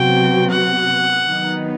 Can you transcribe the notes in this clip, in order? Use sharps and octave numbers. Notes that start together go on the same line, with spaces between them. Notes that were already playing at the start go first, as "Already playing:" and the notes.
Already playing: C3 F#3 B3 F#4 G5
F#5
D#3 F#3 B3 D#4